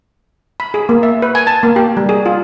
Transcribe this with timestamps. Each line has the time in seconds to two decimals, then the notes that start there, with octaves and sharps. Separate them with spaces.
0.60 B5
0.74 G#4
0.89 A#3
1.03 E5
1.22 B4
1.35 G#5
1.47 A5
1.63 A#3
1.76 G4
1.97 G3
2.09 G#4
2.26 F4